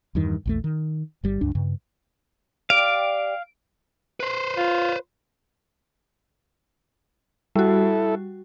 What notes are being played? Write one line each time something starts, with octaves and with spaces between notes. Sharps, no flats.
E2 G2 D#3
A#1 E2 A3
D#3
G1 G3
C#2 G2 D4
G2 C#3
G4 D5 F5 D7
B4 C5
F4
G3 E4 F#4 A4